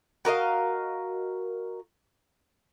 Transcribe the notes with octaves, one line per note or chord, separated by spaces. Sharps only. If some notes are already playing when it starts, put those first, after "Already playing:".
F#4 A#4 D#5 F5